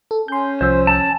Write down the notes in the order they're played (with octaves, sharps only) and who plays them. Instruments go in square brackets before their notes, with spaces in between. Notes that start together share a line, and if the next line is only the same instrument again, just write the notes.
[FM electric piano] A4
[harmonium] C#4 [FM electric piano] C6 G6
[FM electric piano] C2 F3 E6 [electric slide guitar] C5
[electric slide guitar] A5